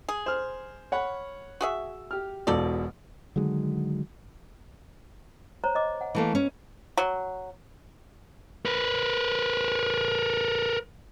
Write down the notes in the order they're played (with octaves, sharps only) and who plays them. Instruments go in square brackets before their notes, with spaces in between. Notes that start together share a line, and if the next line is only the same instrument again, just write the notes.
[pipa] G#4
[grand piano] C5 F6
C#5 F#5 B5
[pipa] F#4 G#4 E5
[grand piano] G4 F6
[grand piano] E1 B2 [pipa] F3 A4 D5
[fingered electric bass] D3 D#3 F#3 G#3
[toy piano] C5 C#5 A#5
D#5 D6
F#5 G#5
[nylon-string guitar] E3 A3 A#3
C#4
[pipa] F#3
[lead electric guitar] A#4 B4